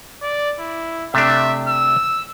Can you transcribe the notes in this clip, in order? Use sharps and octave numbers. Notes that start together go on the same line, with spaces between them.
D5
E4
C3 A3 D4 E5
E6